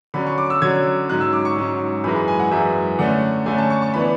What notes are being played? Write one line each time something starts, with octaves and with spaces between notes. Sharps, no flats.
D3 F#3 C#4 B5
C#6
D6
E6
D3 F#3 C#4 G#6
G#2 F#3 C#4 F#6
E6
D6
C#6
G#2 F#3 C#4
F#2 E3 G#3 B5
B5
G#5
F#5
F#2 E3 G#3 E5
D3 A3 C#4 F#5
D3 A3 C#4 G#5
A5
C#6
C#6
E3 B3 D4 B5